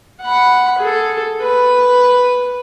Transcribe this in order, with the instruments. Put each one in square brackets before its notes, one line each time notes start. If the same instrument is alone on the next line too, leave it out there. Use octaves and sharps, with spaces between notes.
[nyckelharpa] F#5 B5
G#4 A4
B4